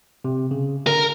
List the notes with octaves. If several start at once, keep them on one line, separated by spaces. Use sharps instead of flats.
C3
C#3
D3 A#4